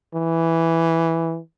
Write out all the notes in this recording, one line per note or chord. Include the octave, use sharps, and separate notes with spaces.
E3